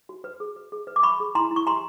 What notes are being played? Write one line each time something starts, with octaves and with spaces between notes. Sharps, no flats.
F#4
B4
G#4
B4
G#4
B4
D6
B4 B5 C#6
G#4
E4 A#5 C6
E4
C#6
G4 A#5 C6